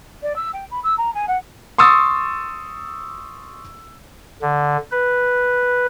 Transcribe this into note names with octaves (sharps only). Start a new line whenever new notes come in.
D5
E6
G5
B5
E6
A#5
G#5
F#5
C6 C#6 D#6 E6 A6
D3
B4